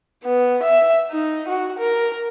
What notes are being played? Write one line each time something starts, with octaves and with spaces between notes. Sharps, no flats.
B3
E5
D#4
F#4
A#4